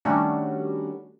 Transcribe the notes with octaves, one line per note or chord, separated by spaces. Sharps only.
D#3 G3 A3 C#4 D4 F#4